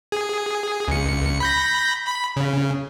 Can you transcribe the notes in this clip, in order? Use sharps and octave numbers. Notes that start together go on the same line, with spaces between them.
G#4
C#2 C#7
B5 G6 A#6
B5
C#3